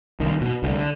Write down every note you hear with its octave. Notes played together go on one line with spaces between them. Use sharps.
C2 D#3
B2
C2 D3